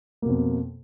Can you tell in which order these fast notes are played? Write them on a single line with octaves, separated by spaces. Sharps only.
A#3 B2 F2